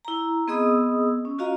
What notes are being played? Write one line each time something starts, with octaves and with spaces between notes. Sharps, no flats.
E4 A#5
B3 C4 G#4 D#5 D#6 E6
C#4
F4 F#4 D#5 F5 A#5